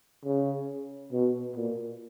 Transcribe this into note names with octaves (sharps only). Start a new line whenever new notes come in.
C#3
B2
A#2